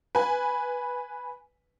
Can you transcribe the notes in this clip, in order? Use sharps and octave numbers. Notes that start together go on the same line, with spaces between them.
B4 G#5